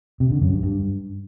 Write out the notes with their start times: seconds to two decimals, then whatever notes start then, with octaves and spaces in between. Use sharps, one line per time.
0.20 C3
0.31 D3
0.42 F#2
0.52 G2
0.63 G2